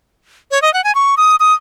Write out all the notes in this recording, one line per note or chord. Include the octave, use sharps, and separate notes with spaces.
C#5
D#5
F#5
G#5
C#6
D#6
D#6